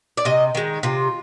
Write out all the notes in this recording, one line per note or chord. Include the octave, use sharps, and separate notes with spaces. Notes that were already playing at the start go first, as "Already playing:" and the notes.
D5
C3 D#5
D#3 G#3
C3 F4